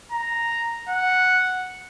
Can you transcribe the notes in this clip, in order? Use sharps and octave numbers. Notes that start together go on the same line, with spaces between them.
A#5
F#5